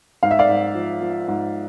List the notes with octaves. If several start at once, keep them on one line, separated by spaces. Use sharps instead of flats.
G#2 F5
E5
D5 F5
G#2
F3
F3
G#2